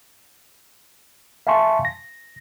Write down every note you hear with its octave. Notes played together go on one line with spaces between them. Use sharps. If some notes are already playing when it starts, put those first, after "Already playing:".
E5 F5 G#5 A5 C6 C#6
A#6